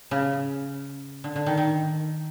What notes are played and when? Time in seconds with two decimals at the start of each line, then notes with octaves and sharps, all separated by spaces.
0.11 C#3
1.24 D3
1.36 D3
1.46 D#3
1.57 D#3